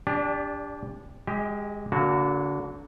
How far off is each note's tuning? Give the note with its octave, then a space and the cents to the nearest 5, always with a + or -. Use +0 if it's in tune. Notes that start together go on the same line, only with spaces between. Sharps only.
D4 -20 G4 +30 D5 +10
G#3 -15 G4 +0 D#5 +30
D3 -35 A#3 +0 F#4 +0